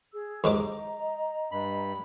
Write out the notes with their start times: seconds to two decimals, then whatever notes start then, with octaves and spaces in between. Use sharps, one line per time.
0.13 G#4 E6
0.44 D#2 G#2 D#5 A#5 D6
1.52 G2 B5